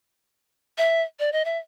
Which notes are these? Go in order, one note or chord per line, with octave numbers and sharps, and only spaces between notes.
E5
D5
D#5
E5